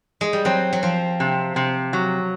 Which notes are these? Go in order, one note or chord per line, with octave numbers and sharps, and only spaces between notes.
G#3
G3
F#3 C4
F#3
F3 C4
C3
C3
F#3